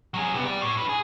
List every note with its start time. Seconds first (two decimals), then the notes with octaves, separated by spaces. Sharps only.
0.14 F#3 G#4
0.34 C3 B3
0.45 G4 D5
0.61 A2
0.77 D4 B4
0.89 G#4